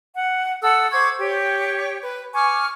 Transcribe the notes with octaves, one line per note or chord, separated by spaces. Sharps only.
F#5
A4 F#5 D#6 E6
C5 C#6 D6 G#6
G4 C#5 G5
B4
G#5 C#6 D6 F6